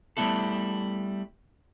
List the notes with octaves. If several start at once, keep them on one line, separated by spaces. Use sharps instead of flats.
G3 A3 B3 E4 A4